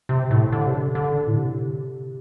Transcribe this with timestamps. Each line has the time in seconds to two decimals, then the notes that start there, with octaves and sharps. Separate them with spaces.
0.09 C3
0.31 A2
0.52 D3
0.66 C3
0.74 D3
0.95 D3
1.27 A2
1.38 C3